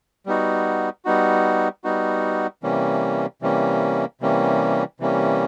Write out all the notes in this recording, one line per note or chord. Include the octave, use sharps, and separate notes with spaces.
G3 B3 D#4 F#4
G3 B3 D#4 F#4
G3 B3 D#4 F#4
C3 E3 G3 A#3 C#4
C3 E3 G3 A#3 C#4
C3 E3 G3 A#3 C#4
C3 E3 G3 A#3 C#4